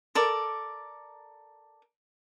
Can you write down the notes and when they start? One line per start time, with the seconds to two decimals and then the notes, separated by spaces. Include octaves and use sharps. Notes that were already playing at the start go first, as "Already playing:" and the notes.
0.15 A4 A#4 D5